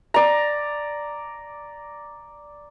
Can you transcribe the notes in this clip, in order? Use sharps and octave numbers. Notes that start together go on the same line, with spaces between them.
D5 A#5